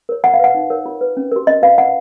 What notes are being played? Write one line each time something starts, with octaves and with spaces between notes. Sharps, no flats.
A#4 C#5
F4 F#5
F5
B4 F#5
D#4
A#4 C#5
F4
B4
C#4
F#4 A#4
C#4 D#5
F4 B4 F5
F4 F#5